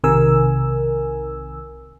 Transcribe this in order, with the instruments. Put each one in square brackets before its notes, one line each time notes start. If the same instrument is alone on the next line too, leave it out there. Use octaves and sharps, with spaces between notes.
[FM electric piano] B1 C3 D#3 A#4 G#5 E6